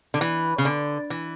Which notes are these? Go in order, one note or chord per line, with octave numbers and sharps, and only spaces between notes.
D3
E3
C#3
D3
E3